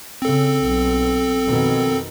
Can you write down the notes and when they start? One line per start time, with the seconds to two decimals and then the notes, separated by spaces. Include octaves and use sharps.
0.22 C#3 C4 A4
0.62 B1
1.45 F2 B2 D#3